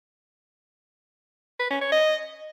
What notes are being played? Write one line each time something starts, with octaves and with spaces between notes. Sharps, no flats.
B4
C#4
C#5
D#5